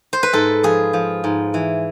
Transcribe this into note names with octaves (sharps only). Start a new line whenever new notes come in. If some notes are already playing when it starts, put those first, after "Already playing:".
C5
B4
G#2 A4
F3 G#4
F3
G#2
E3